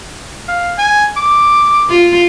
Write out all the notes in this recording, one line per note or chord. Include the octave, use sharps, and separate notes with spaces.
F5
G#5
D6
F4